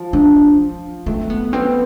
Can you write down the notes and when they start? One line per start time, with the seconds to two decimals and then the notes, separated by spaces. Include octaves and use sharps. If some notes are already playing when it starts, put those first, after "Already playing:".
Already playing: F3
0.13 D4
1.06 A3 C4
1.30 B3
1.53 B3 C4